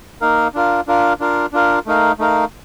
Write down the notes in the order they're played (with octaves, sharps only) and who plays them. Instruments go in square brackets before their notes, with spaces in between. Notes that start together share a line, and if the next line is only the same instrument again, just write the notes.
[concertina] A#3 D#4 A#4 F5
D4 F4 A#4 F5
D4 F4 A#4 F5
D4 F4 A#4 F5
D4 F4 A#4 F5
A3 D#4 A#4 F5
A3 D#4 A#4 F5